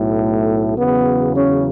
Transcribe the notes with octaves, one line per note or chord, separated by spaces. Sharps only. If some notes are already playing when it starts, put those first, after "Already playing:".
Already playing: B1 A2
A3
E2 C#3 F#3 B3
C#4